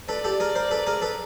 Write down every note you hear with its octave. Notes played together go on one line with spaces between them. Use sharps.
A4 B4 D5
G4 A4
G#4 A#4
A#4 C5
A4 B4
G#4 A#4
A4 B4